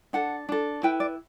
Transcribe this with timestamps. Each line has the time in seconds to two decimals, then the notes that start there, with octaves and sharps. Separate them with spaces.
0.13 D4 A4 F#5
0.49 D4 A4
0.83 E4 B4 G5
1.00 D5